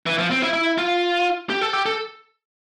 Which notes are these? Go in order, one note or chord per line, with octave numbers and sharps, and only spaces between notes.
E3
F3
C4
E4
E4
F4
G4
A4
G4
A4